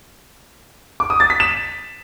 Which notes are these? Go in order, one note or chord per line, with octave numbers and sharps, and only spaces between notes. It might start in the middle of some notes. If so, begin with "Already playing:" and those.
D6
D#6
A6
B6
E7